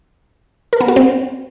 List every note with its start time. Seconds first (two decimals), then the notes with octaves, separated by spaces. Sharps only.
0.73 A#4
0.81 B3
0.88 F#4
0.96 C4